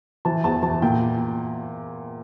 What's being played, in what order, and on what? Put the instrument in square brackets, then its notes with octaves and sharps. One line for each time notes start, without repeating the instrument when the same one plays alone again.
[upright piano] E3 A5
E2 A5
E3 A5
A#2 G5